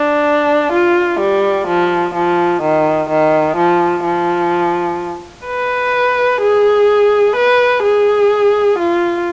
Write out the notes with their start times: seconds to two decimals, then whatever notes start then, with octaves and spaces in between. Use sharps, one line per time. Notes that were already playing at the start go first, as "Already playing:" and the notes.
Already playing: D4
0.73 F4
1.20 G3
1.68 F3
2.15 F3
2.62 D#3
3.09 D#3
3.57 F3
4.04 F3
5.46 B4
6.41 G#4
7.36 B4
7.84 G#4
8.79 F4